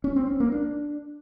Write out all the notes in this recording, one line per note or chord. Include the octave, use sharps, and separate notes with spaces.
C#4
C4
C#4
A#3
D4